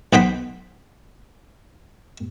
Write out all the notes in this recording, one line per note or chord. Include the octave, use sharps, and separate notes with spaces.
B1 B3 C5 G5 B5